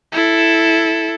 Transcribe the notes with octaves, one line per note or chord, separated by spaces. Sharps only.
E4 A4